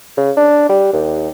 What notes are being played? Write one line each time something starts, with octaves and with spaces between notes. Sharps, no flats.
C#3
D4
G3
D#2